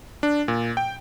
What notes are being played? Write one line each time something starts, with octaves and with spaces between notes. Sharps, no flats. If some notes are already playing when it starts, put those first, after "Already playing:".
D4
A#2
G5